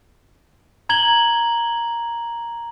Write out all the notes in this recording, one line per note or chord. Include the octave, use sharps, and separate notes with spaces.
A#5 G#6 F#7 G7